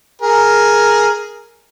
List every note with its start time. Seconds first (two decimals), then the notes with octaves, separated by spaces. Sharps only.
0.22 G#4 A#4